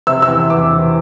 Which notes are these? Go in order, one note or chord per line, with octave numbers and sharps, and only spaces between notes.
C3 E6
E6
E2
E2 D6
E3